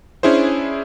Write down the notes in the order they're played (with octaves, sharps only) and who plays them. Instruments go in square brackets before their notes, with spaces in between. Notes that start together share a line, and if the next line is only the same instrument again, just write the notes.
[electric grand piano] C#4 D4 E4 G#4 C5